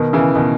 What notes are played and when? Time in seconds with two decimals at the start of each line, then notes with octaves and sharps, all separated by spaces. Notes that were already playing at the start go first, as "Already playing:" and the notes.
Already playing: B2 D#3
0.13 C#3 E3
0.35 B2 D#3